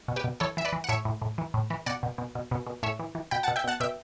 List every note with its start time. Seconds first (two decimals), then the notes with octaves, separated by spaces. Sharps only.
0.08 B2
0.16 G4 B4
0.24 B2
0.40 E3 A4 C#5
0.57 E3 E5
0.65 B4 D5
0.72 E3
0.84 F#5
0.89 A2 C#5 E5
1.05 A2
1.22 A2
1.38 E3
1.54 A2
1.70 E3
1.86 B2 D5 F#5
2.03 B2
2.18 B2
2.35 B2
2.51 B2
2.66 B2
2.83 A2 C#5 E5
2.99 E3
3.15 E3
3.31 B2 G5 B5
3.43 B2 F#5 A5
3.56 E5 G5
3.64 B2 F#5 A5
3.80 B2 E5 G5